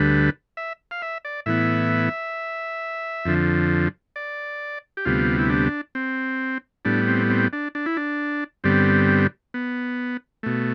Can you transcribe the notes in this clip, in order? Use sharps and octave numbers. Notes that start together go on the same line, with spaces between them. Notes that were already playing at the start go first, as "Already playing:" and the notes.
Already playing: D2 D3 G3 B4
E5
F5
E5
D5
A2 E3 B3 E5
F2 D3 F3
D5
G4
D2 C3 G3 B3 F4
E4
D4
C4
A2 G3 B3 D4
C4
C4
D4
D4
E4
D4
G2 D3 G3 B3 C4
B3
B2 A3